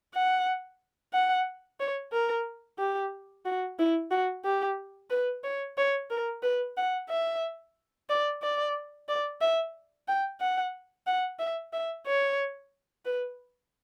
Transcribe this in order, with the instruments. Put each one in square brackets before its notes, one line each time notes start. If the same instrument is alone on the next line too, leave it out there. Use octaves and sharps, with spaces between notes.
[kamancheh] F#5
F#5
C#5
A#4
G4
F#4
E4
F#4
G4
B4
C#5
C#5
A#4
B4
F#5
E5
D5
D5
D5
E5
G5
F#5
F#5
E5
E5
C#5
B4